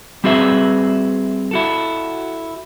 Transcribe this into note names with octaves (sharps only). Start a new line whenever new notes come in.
G3 C4 F#4 G#4 B4 E5
E4 F#4 A4